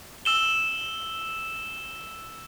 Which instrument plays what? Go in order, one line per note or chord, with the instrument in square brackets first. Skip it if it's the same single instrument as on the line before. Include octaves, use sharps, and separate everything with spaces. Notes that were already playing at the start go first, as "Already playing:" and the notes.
[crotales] E6 E7 G7